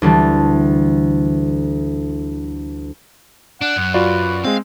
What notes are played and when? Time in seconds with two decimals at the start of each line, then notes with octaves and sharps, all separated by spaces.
0.02 D2 E3 G3 A5
3.61 D4 F#5
3.76 F#2
3.94 F4 F#4 B4 D5
4.44 G#3 C4 F5